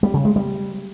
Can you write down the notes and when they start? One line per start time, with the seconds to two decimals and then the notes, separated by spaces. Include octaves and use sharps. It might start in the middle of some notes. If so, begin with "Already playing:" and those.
0.03 G3
0.14 C#3
0.25 G#3
0.36 G3